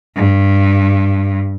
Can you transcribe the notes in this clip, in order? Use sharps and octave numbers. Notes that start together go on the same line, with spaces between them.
G2